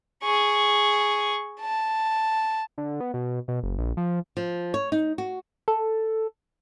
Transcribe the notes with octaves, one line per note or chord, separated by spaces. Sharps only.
G#4 C#6
A5
D3
B3
B2
B2
F#1
A#1
F3
F3
C#5
D#4
F#4
A4